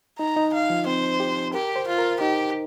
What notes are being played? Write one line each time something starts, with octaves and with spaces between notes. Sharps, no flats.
D#4 A#5
D#4
F5
F3
C4 C5
G4
G4 A#4
C5
F4
A#4
D#4 G4